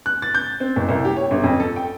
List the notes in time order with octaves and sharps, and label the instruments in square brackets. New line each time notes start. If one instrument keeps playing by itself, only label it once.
[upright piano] F#6
A6
G6
C4
F#1
C2
G4
C#5
G1
F2
A4
G5